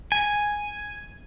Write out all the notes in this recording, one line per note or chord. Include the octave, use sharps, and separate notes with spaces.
G#5